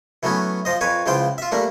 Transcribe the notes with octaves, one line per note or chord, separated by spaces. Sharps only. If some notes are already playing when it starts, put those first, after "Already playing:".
E3 F#3 A3 B3 C#4
F3 C5 D#5
F2 B4 C#5 G#5
C#2 E3 F3 C5 G5
F4 E5
G3 A3 A#3 D4